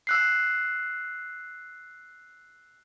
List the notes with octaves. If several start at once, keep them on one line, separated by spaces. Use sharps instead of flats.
E6 F#6 C7